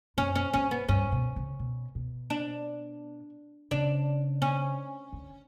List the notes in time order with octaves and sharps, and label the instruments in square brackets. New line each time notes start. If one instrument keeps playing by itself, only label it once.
[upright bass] F#2 [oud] C#4
[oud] C#4
[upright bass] G2 [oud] C#4
[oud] B3
[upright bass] G2 [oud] C#4
[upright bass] B2
C#3
B2
B2
[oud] D4
[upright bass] C#3 [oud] D4
[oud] C#4
[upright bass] D3